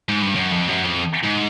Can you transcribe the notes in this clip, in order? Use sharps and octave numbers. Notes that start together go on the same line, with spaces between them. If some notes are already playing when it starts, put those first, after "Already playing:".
G#2
G2
F#2
F2
F#2
F2
G#2